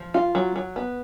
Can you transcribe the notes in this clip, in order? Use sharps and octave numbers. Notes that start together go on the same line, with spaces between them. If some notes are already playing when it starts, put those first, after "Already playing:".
Already playing: F3
F4
F#3
F#3
B3